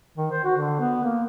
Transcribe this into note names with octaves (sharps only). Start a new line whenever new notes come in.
D#3
C5
F#4
D3
B3
A#3